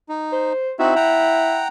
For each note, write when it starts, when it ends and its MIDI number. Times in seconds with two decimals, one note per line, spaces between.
0.09 0.53 63
0.32 0.72 72
0.79 0.94 60
0.79 0.94 63
0.79 1.63 64
0.79 0.94 66
0.96 1.68 78
0.96 1.68 79
0.96 1.68 82